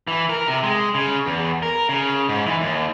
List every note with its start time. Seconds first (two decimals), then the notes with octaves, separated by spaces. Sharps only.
0.07 E3
0.30 A#4
0.48 C3
0.63 G#3
0.95 C#3
1.26 E2
1.63 A#4
1.89 C#3
2.29 G#2
2.46 E3
2.61 D#2